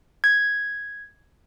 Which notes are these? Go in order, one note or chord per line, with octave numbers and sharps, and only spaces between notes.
G#6